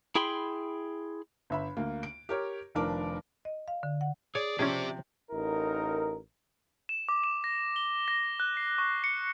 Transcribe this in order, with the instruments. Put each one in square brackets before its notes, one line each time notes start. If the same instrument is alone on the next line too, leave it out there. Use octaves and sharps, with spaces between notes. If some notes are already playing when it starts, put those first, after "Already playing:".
[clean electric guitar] E4 G#4 G5 B5 C6
[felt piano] G1 E5 B5
D2 A#3
D7
G4 A#4 C#5
F1 D#3 F3 D4 A#4 D6
[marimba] D#5
F5
D3
F#5
[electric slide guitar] G#4 [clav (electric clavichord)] C#5 [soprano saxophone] D5
[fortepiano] C3 F3 [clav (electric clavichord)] C#4 G#4 [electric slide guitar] G4 C5 E5
[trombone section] A1 D#4 A#4
[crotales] E7
D6
E7
A#6
G7
A#6
F#6
C7
C#6
C#7